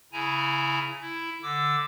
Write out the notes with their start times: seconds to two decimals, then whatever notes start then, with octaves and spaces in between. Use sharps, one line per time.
0.13 C#3 E4 G#5 A#5
1.01 E4
1.42 D3 D6 E6